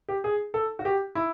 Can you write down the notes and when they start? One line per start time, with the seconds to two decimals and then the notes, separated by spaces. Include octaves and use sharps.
0.09 G4
0.24 G#4
0.54 A4
0.79 F#4
0.85 G4
1.15 E4